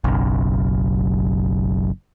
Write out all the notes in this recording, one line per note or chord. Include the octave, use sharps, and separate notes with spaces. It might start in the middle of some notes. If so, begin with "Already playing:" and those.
F#1 B1 F#2